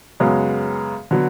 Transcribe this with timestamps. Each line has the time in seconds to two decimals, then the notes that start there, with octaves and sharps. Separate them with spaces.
0.20 F#2 C#3 G#3 B3
1.11 D3 F#3 B3